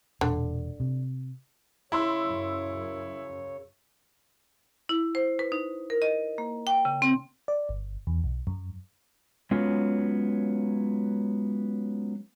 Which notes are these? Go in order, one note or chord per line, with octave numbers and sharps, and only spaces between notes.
E1 A#2 D3
C3
C#3 E4 C#5 B5 C6 E6
F#2
E4
C5
B4
D#4
A#4
D#5
A#3
G5
C#3
C4
D5
G1
E2
B1
F#2
F#3 G#3 B3 C#4 F4